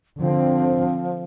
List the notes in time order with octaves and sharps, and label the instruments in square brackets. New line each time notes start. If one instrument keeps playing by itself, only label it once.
[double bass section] D3 C4 [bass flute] F3